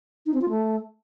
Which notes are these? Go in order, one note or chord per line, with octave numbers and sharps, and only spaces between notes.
D#4
C4
F4
A3